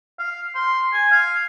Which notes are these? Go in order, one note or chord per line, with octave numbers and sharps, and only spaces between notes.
F5
C6
G#5
F5